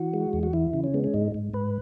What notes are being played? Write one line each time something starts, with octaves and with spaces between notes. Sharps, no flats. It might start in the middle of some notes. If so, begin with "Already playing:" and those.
Already playing: E3 F#4
G#3
E2
F#4
E3 E4
C#3
C#4
G#3 B3
C#4
G#2 D#4
G#2
G#2 B4